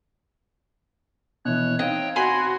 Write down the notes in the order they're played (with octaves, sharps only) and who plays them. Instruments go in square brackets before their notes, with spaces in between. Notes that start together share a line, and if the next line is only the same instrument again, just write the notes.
[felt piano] B2 E3 [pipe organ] C#5 F#6
[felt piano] C4 D#4 F5 [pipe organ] C#5 G5 [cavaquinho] D#5
[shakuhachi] F#4 [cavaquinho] G#5 B5 C6 [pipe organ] G#6